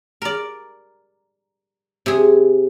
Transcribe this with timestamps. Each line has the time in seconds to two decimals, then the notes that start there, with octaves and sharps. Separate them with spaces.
0.22 A#4 D5
2.06 C3 G#4